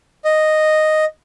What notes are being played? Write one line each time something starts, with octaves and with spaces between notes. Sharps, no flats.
D#5